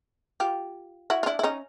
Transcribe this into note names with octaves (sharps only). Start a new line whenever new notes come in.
F4 G4
E4 F#4
F4
D4 E4
E4
C#4 D#4